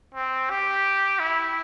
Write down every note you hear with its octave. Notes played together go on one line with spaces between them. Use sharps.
C4
G4
E4